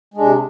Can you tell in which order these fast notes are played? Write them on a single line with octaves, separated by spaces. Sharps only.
G#3 D4 C3